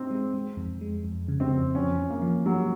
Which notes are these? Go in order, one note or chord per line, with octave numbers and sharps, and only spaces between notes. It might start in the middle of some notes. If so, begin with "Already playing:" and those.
Already playing: C4 D#4
G#3
G#3
F2
G#3
F2
C#3
C4
F2
F3 C#4
F3
A#3
F3
F3 F#3